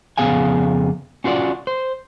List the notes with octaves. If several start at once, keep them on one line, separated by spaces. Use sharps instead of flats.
F2 C#3 B3 G#4 F5 G#5
C#4 F4 F#4 B4 D5
C5